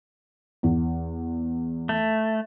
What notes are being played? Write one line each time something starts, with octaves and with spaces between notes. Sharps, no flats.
E2
A3